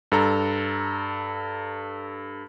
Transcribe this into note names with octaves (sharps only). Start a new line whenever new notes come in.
G2 A4 A#5